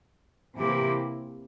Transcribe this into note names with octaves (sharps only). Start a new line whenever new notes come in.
C3 E3 A#3 E4 G4